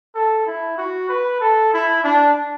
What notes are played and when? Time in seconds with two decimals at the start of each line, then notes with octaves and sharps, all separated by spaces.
0.15 A4
0.47 E4
0.78 F#4
1.09 B4
1.41 A4
1.73 E4
2.04 D4